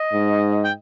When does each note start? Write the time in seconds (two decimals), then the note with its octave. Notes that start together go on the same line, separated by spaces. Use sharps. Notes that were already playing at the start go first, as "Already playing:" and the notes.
Already playing: D#5
0.13 G#2
0.64 G5